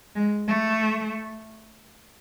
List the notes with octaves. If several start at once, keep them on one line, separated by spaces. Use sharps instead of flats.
G#3
A3